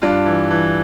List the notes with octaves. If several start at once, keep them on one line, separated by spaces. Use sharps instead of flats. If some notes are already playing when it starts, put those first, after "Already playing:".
G2 D4 F4
E3
E3